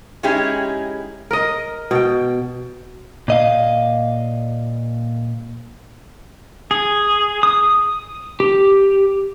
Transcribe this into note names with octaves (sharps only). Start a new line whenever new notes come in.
G#3 C#4 D#4 E4 G4 G#4
A#4 D#5
B2 G5
A#2 D#5 F5
G#4
D#6
G4